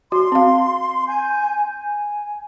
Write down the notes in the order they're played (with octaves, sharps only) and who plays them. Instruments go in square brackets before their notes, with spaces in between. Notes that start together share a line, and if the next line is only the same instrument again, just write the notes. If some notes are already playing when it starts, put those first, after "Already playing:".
[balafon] F#4 [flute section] C6
[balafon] C4 F5
[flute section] G#5 G6
G#5